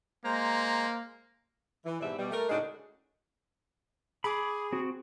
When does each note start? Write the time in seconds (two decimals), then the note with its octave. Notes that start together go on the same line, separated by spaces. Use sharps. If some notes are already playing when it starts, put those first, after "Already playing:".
0.24 G#3 A#3 C5 A#5
1.86 E3
2.01 G#2 B2 E3 G3 D5 E5
2.18 B2 G3
2.31 A3 A#4
2.50 A2 C#3 G#3 D4 D#4 F#4
4.24 G#4 B5 D6
4.73 C4 F#4